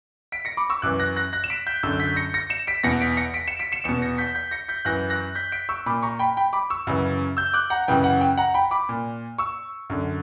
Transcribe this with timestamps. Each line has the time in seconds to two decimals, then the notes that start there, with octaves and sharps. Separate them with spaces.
0.32 B6 D7
0.45 A#6 C#7
0.57 B5 D6
0.70 C#6 E6
0.82 F#2 D6 F#6
0.86 E3
0.99 F#6 A#6
1.16 F#6 A#6
1.33 F#6 A#6
1.44 E7
1.50 B6 D7
1.67 G6 B6
1.83 F#2 D3 E6 G6
2.00 G6 B6
2.16 A#6 C#7
2.34 A#6 C#7
2.50 C#7 E7
2.67 B6 D7
2.83 E2 B2 A#6 C#7
3.00 B6 D7
3.17 A#6 C#7
3.34 B6 D7
3.48 C#7 E7
3.59 B6 D7
3.72 C#7 E7
3.84 E2 C#7 E7
3.89 B2
4.02 A#6 C#7
4.18 G6 B6
4.35 G6 B6
4.51 A#6 C#7
4.68 G6 B6
4.85 F#2 E3 F#6 A#6
5.10 F#6 A#6
5.35 G6 B6
5.52 B6 D7
5.69 C#6 E6
5.86 A#2 B5 D6
6.03 A#5 C#6
6.19 G5 B5
6.37 G5 B5
6.53 B5 D6
6.70 C#6 E6
6.87 F#2 C#3 E3
7.37 E6 G6
7.53 D6 F#6
7.70 F#5 A#5
7.88 F#2 C#3 E3 G5
8.04 F#5
8.21 G5
8.37 F#5 A#5
8.54 G5 B5
8.71 B5 D6
8.89 A#2
9.38 C#6 E6
9.90 F#2 D3